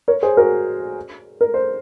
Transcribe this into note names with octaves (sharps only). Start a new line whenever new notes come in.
A#4 C#5
G#4 C5
F#4 A#4
A#4
C5